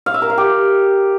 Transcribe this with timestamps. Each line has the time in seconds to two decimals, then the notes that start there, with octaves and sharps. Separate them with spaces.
0.06 F5
0.14 E5
0.22 A#4
0.30 F5
0.38 G4